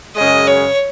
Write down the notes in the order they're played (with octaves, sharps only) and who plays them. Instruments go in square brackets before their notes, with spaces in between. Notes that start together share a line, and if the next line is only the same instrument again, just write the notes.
[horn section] F#2 C#3 G#3 [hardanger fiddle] D#5
[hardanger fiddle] C#5